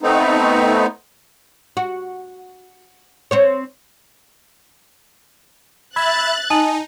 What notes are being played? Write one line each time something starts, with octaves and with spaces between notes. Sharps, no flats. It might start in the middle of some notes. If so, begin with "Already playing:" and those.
A3 B3 C4 D#4
F#4
C4 C5 C#5
E5 B5 F#6 G#6 A6
D#4 G#5 A5 D#6 D#7